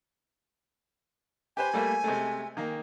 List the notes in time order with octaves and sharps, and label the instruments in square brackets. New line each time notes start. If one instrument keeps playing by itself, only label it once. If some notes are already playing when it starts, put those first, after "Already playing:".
[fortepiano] G4 B4 C5 [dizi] G#5
[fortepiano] G3 A3 A#3
C3 G#3 A3
D#3 A#3